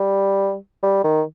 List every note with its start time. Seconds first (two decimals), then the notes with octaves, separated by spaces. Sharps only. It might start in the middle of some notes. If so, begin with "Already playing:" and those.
Already playing: G3
0.83 G3
1.04 D#3